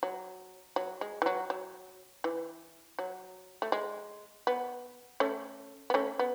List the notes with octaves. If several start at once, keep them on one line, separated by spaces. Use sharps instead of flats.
F#3
F#3
G#3
E3
F#3
F#3
E3
F#3
A3
G#3
B3
A3 C#4
B3
A3 C#4
B3